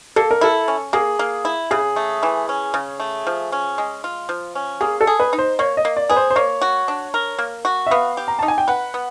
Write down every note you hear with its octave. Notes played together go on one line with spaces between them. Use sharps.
A#3 A4
A#4
E4 A4
C#4
A#3 G#4
A#3
E4
C#3 G#4
A3
E3
C#4
C#3
A3
F3
C#4
G#3
F4
F3
C#4
A#3 G#4
A4
G#4
B4
D#4
C5
A#3 C#5
D#5
A#3
D5
G#4 B4
C5
C5
A#3 C#5
F#4
D4
A#4
A#3
F#4
E5
B3 F5
G4
A#5
D#4 A5
G#5
G5
B4 F#5
B3